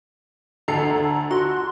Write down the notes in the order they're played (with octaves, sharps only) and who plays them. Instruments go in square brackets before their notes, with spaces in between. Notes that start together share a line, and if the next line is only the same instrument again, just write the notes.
[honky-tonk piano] D2 A4 C7 [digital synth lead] A#5
[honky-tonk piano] F#4 [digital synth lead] C6